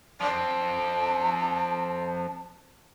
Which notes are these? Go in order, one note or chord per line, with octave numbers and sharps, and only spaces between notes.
F3 C4 A5